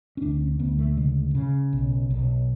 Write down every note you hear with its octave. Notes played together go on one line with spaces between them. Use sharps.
C#4
D2 D4
C#4
D2 B3
A3
C#3 G#3
C#3
B1
B1